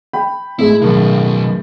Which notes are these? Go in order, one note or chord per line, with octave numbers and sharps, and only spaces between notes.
G5 B5
A2 G#3 E4
B1 F#2 D#3